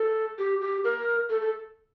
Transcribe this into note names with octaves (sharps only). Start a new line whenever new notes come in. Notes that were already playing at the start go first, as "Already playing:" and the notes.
Already playing: A4
G4
G4
A#4
A4
A4